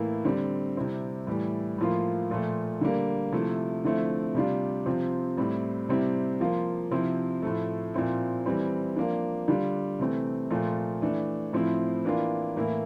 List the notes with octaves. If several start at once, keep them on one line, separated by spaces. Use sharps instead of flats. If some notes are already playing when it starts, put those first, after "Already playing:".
Already playing: A2 E3 A#3 E4
D3 G3 C4
C3 G3 C4 E4
A2 E3 G3
A2 F3 A#3 F4
A#2 F3 A3
D3 G3 A#3
C3 F3 A3 E4
D3 F3 A3 C4 E4
C3 G3 D4 F4
C3 F3 C4 F4
A2 G3 C4 E4
C3 G3 C4 E4
F3 A#3 F4
C3 F3 C4 E4
A2 F3 A3
A#2 F3 C4 E4
E3 G3 C4
F3 A#3 D4
D3 G3 D4 F4
C3 E3 A3 C4
A#2 F3 A3
E3 A3 D4
A2 F3 C4 E4
E3 A#3 D4 F4
A2 E3 A#3 E4